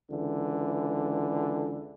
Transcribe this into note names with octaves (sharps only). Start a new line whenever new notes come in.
C#2 D3 E3